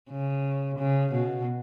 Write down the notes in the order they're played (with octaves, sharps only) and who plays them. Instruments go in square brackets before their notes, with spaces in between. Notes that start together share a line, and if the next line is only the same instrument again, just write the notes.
[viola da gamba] C#3
C#3
B2